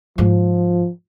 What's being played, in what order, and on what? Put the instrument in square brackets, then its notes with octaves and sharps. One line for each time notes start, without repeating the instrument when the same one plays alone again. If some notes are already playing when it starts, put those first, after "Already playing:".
[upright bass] G#2 F4 [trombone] F3